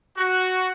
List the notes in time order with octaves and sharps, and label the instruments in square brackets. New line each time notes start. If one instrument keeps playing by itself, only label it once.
[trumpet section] F#4